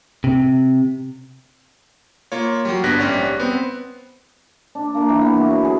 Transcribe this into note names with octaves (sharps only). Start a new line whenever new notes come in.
C3
A#3 F4 C#5
F#3 G3
G1 B3 D4 F#6 A#6 B6
A#1 G#2 G3 C#4 D5
B3 C4
D4
A#3
E3
B3
F#4
F#3
G#4